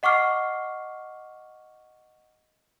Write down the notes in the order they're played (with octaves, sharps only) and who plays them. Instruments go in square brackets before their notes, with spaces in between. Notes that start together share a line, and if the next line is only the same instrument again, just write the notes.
[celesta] D#5 F#5 C#6 D6 F6 C7